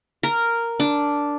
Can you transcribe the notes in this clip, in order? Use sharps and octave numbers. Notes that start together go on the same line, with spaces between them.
A#4
D4